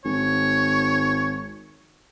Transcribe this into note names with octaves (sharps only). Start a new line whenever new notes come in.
G#1 C#5